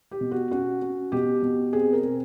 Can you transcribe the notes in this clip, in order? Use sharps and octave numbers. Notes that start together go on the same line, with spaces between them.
G4
B2
F#4
C#4 F#4
C#4
B2 G4
B2
C4 G#4
A#4
C4